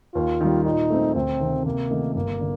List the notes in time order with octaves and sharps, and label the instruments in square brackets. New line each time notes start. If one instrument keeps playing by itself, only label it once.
[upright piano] D#2 [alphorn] F4
[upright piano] D#3 G3
[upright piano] A#2 [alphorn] D#4
[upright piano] A3 C4
[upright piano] D2 [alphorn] C4
[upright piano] C3 D#3
[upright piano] C3 [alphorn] A#3
[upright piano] D#3 A3 D#4 A4
[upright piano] G1 [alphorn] A#3
[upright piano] D3